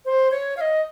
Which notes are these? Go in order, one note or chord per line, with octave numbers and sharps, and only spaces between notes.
C5
C#5
F5
D#5